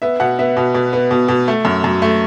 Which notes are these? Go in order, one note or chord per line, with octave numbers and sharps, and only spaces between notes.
B3 E5
B2 F#5
B3 E5
B2
B2
B3
B2
B2
A3
F#2
F#2
A3